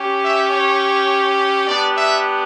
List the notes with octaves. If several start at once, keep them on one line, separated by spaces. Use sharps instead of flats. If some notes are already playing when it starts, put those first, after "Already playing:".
Already playing: C#4 G4
E5
C#5
B3 D4 G4 D5
E5